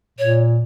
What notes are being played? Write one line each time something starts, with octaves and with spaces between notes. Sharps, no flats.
A#2 C#5